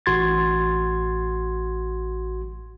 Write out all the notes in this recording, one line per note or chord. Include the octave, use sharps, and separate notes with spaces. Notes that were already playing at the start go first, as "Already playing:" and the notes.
A1 F#4 C6 G#6 A6